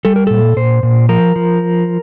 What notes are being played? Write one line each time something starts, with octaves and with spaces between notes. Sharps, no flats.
G3 A4
A#4
A#2 A4
A#2 C5
A#2
F3 A#4
F3